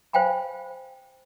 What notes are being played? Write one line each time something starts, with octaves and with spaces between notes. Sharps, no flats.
C5 F5 G5 G#5 B5